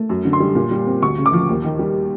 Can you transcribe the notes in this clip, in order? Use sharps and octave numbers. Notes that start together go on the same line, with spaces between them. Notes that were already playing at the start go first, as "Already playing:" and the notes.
Already playing: A3
F#2
D3
C6
G3
A#2
G3
C4
D2 C#6
C#3
D6
F3
D#2
D#3
G3